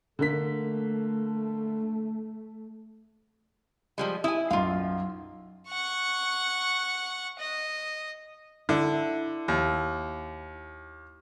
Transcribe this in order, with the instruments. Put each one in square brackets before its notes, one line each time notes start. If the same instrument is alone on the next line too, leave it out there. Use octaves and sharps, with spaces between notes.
[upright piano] D3 A#3 B6 [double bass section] A3
[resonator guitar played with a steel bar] F3 G3 G#3
[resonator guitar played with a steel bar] E4 G#5 [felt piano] D#6
[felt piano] B1 F#2 [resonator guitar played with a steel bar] F4 F5
[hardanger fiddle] F#5 C#6
D#5
[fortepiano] D3 [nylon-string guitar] E4
[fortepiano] D#2